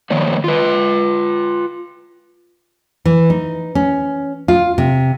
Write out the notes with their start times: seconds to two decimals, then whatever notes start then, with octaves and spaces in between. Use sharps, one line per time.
0.10 D#3 F3 A#3 C#5 D5
0.44 F4 B4
3.05 E3
3.30 D#4
3.75 C#4
4.48 F4
4.78 C3